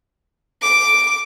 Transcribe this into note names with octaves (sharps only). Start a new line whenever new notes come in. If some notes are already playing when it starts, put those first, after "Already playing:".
D6